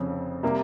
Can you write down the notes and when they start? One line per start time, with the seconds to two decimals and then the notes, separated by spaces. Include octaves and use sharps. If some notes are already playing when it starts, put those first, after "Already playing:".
Already playing: F1 F2 C#3 F3 C4
0.43 C3 G3 A#3